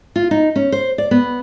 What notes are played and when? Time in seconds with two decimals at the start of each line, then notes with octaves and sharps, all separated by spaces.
0.16 F4
0.31 D#4
0.56 C#4
0.72 C5
0.98 D5
1.11 B3